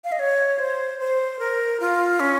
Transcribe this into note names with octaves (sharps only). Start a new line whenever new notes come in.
F5
D#5
C#5
C5
C5
A#4
F4
C#4